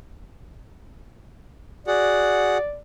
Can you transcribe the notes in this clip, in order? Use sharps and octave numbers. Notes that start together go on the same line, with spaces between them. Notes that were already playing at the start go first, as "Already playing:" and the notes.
F#4 G#4 D5 F#5